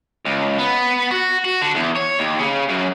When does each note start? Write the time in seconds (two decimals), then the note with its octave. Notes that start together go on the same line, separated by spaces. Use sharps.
0.25 C#2
0.58 B3
1.11 F#4
1.45 F#4
1.61 D3
1.75 E2
1.96 C#5
2.19 D#2
2.39 C#3
2.69 F#2